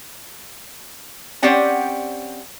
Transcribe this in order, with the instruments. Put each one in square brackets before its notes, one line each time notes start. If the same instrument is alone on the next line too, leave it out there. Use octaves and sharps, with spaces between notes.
[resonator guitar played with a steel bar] C4 C#4 G4 D5 F#5 G5